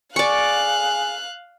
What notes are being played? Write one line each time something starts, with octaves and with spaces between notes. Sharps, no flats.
G#4 D5 F5 C#6 F#6